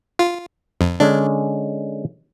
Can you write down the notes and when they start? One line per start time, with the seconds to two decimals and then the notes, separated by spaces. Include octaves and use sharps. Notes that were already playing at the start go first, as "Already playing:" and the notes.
0.19 F4
0.81 F2
1.00 D3 G#3 C#4 D4